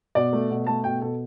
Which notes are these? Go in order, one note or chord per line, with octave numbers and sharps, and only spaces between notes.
B2 D5
A3
B2
A3 A5
B2 G5
B2 A4